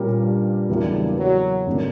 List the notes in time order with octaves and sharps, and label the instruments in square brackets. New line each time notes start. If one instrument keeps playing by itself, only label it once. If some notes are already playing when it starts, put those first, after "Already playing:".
Already playing: [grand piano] A#2 G3 C#4 G4 A#4
[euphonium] G2
[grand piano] E2 C#3 F#3 A#3 E4 [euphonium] G2
[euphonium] F#3
[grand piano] G1 D3 A#3 D4